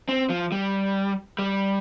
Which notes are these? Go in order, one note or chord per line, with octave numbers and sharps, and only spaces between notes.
C4
F3
G3
G3